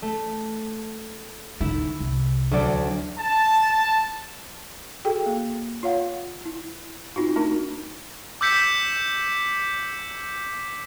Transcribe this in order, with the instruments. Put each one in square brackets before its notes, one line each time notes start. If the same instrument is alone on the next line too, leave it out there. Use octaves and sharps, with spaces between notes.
[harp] A3
[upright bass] D3 D#4 [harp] E4
[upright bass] C2
[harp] D2 F#3 D5
[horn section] A5
[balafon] F#4 G#4 A4 G5
A#3
F4 C#5 F5 F#5
E4
C4 D#4 F4 F#4
A3 D4 D#4 F#4 A#4
[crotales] D6 E6 G6 B6 C#7